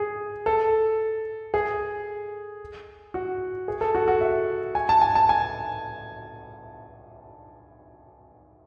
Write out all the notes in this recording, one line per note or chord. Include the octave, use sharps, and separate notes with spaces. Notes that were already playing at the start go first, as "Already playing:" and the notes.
Already playing: G#4
A4
G#4
F#4
G#4
A4
F#4
F#4
E5
G#5
A5
G#5
A5
G#5